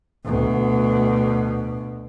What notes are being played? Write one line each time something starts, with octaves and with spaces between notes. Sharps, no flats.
D2 B2